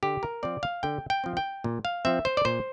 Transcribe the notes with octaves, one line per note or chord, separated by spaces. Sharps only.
D3 G4
A#4
F3 C4 D5
F5
D3 G5
G5
F3 C4
G5
A#2
F5
F3 C4 E5
C5
D5
A#2 C5